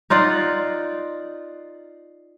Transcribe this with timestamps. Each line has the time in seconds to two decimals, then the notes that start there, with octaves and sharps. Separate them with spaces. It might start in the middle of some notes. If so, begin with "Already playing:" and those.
0.10 D#4 F4 D5 F#5